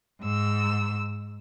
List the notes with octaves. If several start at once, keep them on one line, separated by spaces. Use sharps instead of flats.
G#2 E6